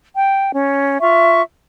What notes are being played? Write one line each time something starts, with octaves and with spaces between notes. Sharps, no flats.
G5
C#4
F4 E5 C#6